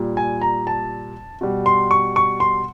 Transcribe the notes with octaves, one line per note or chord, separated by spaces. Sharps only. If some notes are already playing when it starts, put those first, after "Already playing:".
Already playing: A#2 G3
G#5
A#5
A5
B2 G3
C6
C#6
C#6
C6